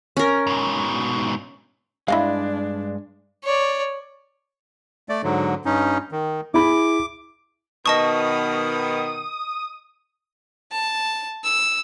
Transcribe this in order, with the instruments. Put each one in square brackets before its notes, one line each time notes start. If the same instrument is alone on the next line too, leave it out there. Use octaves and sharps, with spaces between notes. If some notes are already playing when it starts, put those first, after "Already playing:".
[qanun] C#4 A#4
[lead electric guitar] G#2 B2
[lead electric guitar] G2 G#3 [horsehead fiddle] D4 [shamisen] E4 D#5 F5
[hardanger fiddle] C#5 D5
[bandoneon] A3 D5
G#2 D3 F#3
G2 C#4 D#4
D#3
[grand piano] E4 G#4 B5 [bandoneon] D6
[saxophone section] B2 D#3 [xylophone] D#5 A5 C#6 [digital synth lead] D#6
[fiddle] A5
E6